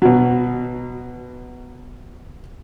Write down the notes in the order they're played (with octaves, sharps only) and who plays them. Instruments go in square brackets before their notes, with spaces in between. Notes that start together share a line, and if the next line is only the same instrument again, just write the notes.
[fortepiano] B2 F#3